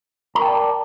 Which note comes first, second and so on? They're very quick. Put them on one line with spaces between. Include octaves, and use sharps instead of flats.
A#5 A#4 G5 A5 D5